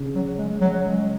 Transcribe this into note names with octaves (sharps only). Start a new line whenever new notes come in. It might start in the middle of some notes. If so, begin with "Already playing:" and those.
Already playing: C#3
F#3
G#3
F#3
G#3